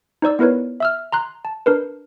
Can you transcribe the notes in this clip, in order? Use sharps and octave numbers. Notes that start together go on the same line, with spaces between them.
D#4 C5 D5 E6
B3 E4 A#4 B4 C#5
E5 E6 F6
A#5 C6 F#6
A5
D4 A#4 B4